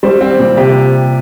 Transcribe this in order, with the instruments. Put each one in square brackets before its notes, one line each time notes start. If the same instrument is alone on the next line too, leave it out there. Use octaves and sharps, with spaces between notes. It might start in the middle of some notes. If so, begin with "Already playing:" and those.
[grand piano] G3 C5
C4
A#2
C3 G4